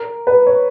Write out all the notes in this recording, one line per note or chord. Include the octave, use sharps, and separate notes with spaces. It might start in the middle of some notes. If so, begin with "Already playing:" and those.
Already playing: A#4
B4
C#5